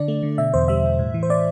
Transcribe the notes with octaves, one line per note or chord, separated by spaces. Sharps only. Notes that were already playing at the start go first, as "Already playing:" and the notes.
Already playing: D3 D4 D5
A3
D3
B2 E5
E2 C5
G3 E5
G3
A2
E3
C5
A2 D5